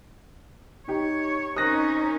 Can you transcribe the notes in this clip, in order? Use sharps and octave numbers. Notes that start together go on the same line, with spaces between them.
D#4 G4 C#5
C4 C#4 D#4 A#4 C5 D#6 F#6 A#6